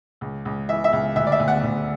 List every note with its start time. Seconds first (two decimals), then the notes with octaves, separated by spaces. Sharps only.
0.21 C#2
0.45 C#2
0.69 E3 E5
0.84 E5
0.93 C#2
1.16 D2 E5
1.27 D5
1.32 E5
1.40 D2
1.48 F#5
1.63 D2